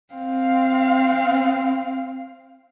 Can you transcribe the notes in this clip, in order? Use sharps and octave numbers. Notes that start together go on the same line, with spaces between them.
C4 F5